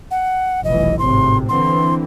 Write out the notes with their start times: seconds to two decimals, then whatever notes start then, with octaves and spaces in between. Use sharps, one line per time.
0.11 F#5
0.64 F1 B1 E3 D#5
0.99 G#1 A2 C3 C6
1.49 D3 E3 C4 C6